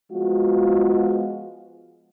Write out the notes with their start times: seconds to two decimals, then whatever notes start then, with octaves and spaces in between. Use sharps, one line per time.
0.12 F3 G#3 B3 F4 F#4